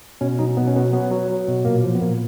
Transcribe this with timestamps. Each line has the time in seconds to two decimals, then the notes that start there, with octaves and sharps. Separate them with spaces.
0.21 B2 C#4
0.39 F#3 D#4
0.57 B2 B3
0.67 C#4
0.75 F#3 B3
0.93 F#3 B3
1.11 F#3
1.30 F#3
1.48 B2
1.65 A#2 A#3
1.84 F3
1.95 B3
2.01 A#2 A#3